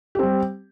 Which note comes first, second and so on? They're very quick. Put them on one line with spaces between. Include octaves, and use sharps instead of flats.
G4 C4 G3